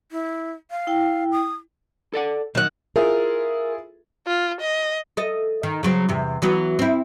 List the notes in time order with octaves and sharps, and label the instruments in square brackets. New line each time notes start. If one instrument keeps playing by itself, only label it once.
[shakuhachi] E4
F5
[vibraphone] E4 G5
[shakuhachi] D#6
[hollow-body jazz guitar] A4 D5 F#5
[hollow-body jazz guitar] F#2 [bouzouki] D#3 F#5
[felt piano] E4 F4 G#4 [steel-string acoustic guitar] A#4
[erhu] F4
D#5
[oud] A4 D#5
D#3
C#3 F#3 C4
E2 C3
E3 F#3 B3
C4 E4